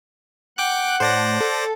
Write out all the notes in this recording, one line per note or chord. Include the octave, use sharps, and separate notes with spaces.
F#5 G5 D6 F#6
A2 C5 D5 A#6
A4